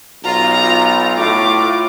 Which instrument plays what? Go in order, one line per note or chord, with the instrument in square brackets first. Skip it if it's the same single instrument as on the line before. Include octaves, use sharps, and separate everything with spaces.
[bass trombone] B1 [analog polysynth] F4 [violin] A#5
[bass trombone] A2 [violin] D6